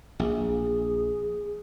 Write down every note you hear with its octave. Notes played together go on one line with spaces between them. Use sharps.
A#1 G#4